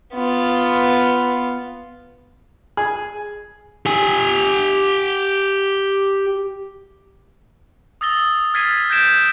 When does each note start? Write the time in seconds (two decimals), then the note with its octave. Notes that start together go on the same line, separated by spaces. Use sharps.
0.14 B3 F4
2.77 G#4
3.86 G4 G#5
8.01 D#6 E6 A6 A#6 G7
8.54 F6 G#6 A6 B6 C7 D#7
8.90 G6 G#6 A#6 B6 D7 E7